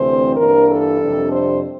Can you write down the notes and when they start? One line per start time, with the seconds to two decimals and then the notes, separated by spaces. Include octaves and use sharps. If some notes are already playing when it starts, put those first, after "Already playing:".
Already playing: D2 C3 E3 A3 C4 C5
0.37 G2 E3 A#3 D4 A#4
0.69 A4
1.01 F2 C3 G3 D4
1.32 C5